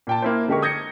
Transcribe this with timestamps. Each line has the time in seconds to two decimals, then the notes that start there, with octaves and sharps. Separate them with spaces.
0.07 A#2 G5 A5
0.22 A#3 E4 C5
0.48 D3 G#3 G4 A#4 C#6
0.62 D#6 G6 G#6 A#6 C#7